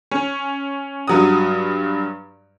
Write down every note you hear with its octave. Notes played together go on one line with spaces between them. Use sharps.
C#4
G2 F#3 D#6